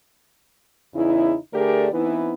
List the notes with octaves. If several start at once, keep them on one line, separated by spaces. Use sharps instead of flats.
E2 C#3 D#4 E4
D3 A3 G4 G#4 A#4 D5
E3 B3 C4 D#4 E4